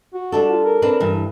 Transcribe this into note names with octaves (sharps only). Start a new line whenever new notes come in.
F#4
G3 D4 A4
F4
A#4
C4 D4 B4
G2 E3